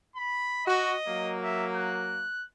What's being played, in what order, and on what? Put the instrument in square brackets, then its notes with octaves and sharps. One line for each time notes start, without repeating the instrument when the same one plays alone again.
[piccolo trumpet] B5
[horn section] F#4 [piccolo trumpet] D#5
[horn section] F#3 A#3
[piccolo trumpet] E5
F#6